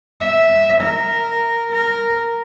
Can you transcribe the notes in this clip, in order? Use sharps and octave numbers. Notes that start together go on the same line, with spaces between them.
E5
A#4
A#4